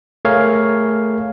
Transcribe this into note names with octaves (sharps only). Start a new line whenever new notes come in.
A3 G#4 A#4 C#5 F5